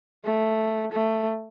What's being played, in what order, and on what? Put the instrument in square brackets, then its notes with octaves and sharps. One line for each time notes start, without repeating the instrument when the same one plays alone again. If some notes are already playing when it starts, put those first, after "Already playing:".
[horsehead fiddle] A3
A3